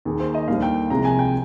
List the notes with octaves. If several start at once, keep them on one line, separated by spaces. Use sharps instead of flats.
D#2 D#3 A#3 G#4
C5
D#5
D#2 D3 G3 F5
G5
C2 C3 F3 G#3 A#5
G#5
G5